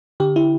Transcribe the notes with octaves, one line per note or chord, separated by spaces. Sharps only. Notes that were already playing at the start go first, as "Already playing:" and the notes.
D3 G4
E4